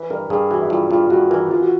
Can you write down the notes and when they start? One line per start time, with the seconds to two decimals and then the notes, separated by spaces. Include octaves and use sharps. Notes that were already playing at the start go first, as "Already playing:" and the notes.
Already playing: E3 B4
0.10 G2 A#4
0.30 G2 G#4
0.51 E3 F#4
0.61 E4
0.70 G2 F4
0.90 G2 F4
1.10 G2 F#4
1.31 E3 A#4
1.51 E3 F4
1.61 F#4